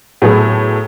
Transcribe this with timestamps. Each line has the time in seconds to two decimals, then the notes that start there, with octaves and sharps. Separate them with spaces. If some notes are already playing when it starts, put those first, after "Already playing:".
0.22 A2 F#3 B3 G#4 A4